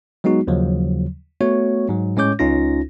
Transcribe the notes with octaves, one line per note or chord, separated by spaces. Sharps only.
F#3 G#3 B3 D#4 F#4
D#2 C#3 F3 F#3
A3 B3 F#4 C#5
G#2 F#3
A2 G#3 C#4 C#5 D6 G6
C#2 C#4 D#4 F4 A#6